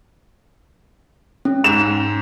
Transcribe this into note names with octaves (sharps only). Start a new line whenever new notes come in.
C#4
G#2 E7